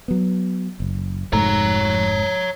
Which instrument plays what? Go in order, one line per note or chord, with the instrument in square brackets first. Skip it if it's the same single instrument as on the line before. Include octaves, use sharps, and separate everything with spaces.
[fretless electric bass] F#3 B3
F#1
[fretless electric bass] F1 G#2 A3 [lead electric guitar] C#5 A#5